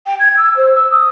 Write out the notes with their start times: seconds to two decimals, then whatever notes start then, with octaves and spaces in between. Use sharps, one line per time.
0.06 G5
0.19 G#6
0.37 E6
0.56 C5
0.75 E6
0.91 D#6